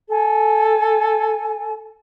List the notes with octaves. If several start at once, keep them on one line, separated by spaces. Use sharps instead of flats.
A4 G#5